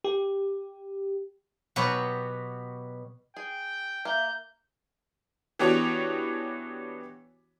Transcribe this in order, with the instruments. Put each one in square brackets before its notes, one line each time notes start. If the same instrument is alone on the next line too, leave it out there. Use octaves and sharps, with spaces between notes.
[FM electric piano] G4
[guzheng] B2 F#3 B3 G4 B4 C#5
[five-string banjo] G#4 [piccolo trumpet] G5
[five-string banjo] A#3 [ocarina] E5 [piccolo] G6
[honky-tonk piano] E3 B3 D4 F#4 G4 C#5